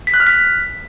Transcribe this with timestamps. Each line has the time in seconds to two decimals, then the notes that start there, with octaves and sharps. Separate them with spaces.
0.07 B6
0.14 F#6
0.20 F6
0.27 B6